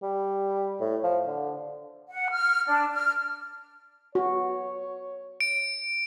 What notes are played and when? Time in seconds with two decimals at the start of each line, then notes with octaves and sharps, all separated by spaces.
0.03 G3
0.80 A2
1.04 F3
1.27 D3
2.10 F#5
2.32 F6
2.67 D4
2.94 F6
4.15 F#4 C#5
5.40 D7